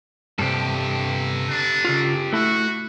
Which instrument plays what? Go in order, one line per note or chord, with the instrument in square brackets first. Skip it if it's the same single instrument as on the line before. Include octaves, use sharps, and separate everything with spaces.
[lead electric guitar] G2 C3 [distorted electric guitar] G4 A4
[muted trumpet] D4
[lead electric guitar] C#3 F4
[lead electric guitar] A3 E4 [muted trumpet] F#4